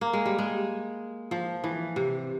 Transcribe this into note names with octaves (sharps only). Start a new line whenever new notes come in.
A#3
G#3
G3
G#3
F3
E3
C3